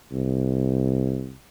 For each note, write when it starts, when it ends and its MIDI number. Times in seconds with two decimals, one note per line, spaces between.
0.12 1.32 36